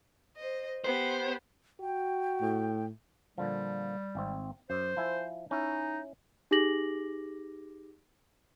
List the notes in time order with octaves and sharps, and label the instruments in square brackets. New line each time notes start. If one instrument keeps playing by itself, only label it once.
[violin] C5 D#5
[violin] B3 G4 [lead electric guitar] C5
[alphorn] F#4 [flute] G5
[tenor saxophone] A2
[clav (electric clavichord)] A#2 D3 F3 [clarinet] G3
[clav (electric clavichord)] G#1 C4
[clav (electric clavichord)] F#2 [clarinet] C5
[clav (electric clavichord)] F3 E4 G#5
[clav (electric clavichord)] C#4 E4 [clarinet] D#4
[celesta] D#4 G4 G#4 D6 A#6 F#7